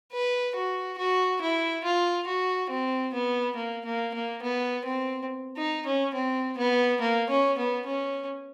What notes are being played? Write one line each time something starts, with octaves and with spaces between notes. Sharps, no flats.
B4
F#4
F#4
E4
F4
F#4
C4
B3
A#3
A#3
A#3
B3
C4
D#4
C#4
C4
B3
A#3
C#4
B3
C#4